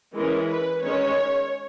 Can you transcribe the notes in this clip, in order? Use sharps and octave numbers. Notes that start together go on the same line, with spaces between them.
E3 G#3 C#4 A#4
B4
D#3 G#3 C#4 C#5